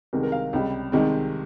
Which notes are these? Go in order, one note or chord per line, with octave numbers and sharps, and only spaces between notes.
C2 C3 D#3 G#3 A#4
A#4
F5
C#2 C3 G3
C2 C3 D#3 G#3